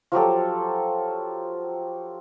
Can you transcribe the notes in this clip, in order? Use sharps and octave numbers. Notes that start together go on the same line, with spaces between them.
F3 F#3 G4 A4